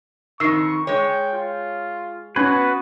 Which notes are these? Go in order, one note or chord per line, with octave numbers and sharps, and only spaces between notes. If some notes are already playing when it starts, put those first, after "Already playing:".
F2 D#3 C#6 E6 C7
G#3 C#5 G5
F4
B3 C#4 F#4 B4 G#6